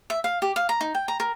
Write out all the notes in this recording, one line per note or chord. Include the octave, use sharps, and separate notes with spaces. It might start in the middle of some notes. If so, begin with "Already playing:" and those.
E5
F5
G4
F5
A#5
D#4
G5
A#5
A#4